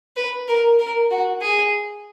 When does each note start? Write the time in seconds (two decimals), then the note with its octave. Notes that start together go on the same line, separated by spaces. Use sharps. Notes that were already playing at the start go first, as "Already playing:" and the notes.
0.16 B4
0.48 A#4
0.79 A#4
1.11 F#4
1.41 G#4